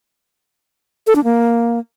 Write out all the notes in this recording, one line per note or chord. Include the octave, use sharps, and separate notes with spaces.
A4
D4
A#3